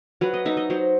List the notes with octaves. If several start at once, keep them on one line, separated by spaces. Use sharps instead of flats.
F#3 B4
D#5
D#4 E5
D#5
F#3 C5